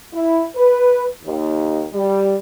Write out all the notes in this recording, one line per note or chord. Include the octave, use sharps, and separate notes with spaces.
E4
B4
D#2
G3